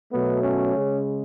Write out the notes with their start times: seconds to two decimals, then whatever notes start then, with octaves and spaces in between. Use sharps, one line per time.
0.12 B2 F#3 A3 B3
0.42 C#4
0.74 C#3 G#3